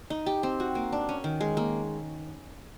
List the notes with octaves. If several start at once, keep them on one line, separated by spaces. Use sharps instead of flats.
D#4
G4
C4
F#4
A#3
D4
C#4
D#3
G#3
A#3